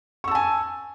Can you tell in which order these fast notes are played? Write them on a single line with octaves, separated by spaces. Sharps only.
C#6 E6 A5 G#5